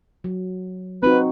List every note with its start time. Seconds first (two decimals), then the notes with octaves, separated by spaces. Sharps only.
0.24 F#3
1.03 C4 D#4 F#4 B4